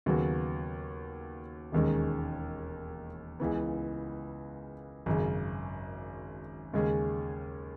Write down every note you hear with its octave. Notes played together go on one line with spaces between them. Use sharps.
D#2 C#3 F#3 B3 F#4
E1 D#2 D#3 G#3 C#4
C#2 C#3 E3 B3
G#1 F#2 C#3
D#2 C#3 G#3 C#4 G#4